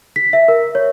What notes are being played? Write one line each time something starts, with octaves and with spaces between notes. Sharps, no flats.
B6
E5
A#4
C#5